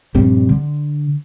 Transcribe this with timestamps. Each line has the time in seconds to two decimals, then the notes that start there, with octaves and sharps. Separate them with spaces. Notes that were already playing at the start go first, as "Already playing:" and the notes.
0.14 A#1 G2 G3 C4
0.49 D3